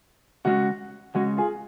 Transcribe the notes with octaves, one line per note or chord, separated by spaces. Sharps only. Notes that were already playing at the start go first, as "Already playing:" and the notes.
C#3 G#3 C#4 F#4
C#3 G#3 C#4 F#4
F4 G#4